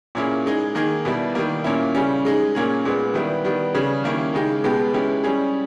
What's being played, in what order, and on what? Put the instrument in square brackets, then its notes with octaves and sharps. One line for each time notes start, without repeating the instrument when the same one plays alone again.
[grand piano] A#2 A#3 C#4 E4 G#4
G#3 D#4 G#4
D#3 A#3 D#4 G#4
B2 G3 B3 E4
D#3 G3 A#3
A#2 A#3 C#4 E4
C#3 G3 C#4
G#3 D#4 G#4
A#2 A#3 C#4 G#4
A#2 G#3 B3
D#3 G3 B3 E4
D#3 G3 B3
C#3 G3 C#4 G#4
D#3 A#3 C#4 E4
C#3 G#3 D#4 G4
B2 G#3 B3 G4
G#3 C#4 E4 G4
G3 C#4 G#4